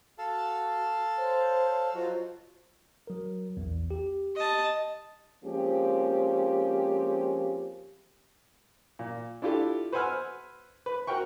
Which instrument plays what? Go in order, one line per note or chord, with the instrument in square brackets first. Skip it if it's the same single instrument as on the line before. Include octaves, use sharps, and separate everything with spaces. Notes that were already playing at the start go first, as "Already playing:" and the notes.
[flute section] F#4 [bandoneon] A4 F5 A5
[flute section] C5 C#5
[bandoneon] F#3 F#4 [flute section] F4 C5 D#5
[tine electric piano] F#3 A#4
A#1 E2
G4
[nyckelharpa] D#5 A5
[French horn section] F3 G#3 A#3 C4 C#4 G4
[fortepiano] A#2
D4 E4 F4 G4 A4
B4 C5 F#5 G#5 E6 F6
B4
F#4 A#4 F#5 G5 C#6